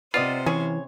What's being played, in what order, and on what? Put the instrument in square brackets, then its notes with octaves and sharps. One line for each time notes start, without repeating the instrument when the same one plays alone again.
[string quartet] C3 C5 [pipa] B3 D5 D#5 [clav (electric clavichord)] F4
[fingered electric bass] E3 [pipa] C#4 G#4 C#5